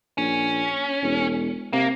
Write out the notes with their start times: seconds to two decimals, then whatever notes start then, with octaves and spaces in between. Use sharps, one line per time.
0.18 A#1 C#4
1.02 E1
1.73 C3 A#3